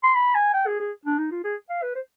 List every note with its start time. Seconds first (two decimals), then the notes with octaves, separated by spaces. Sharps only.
0.03 C6
0.15 B5
0.35 G#5
0.54 G5
0.67 G#4
0.80 G#4
1.05 D4
1.18 D#4
1.31 F4
1.44 G#4
1.70 F5
1.83 B4
1.95 C5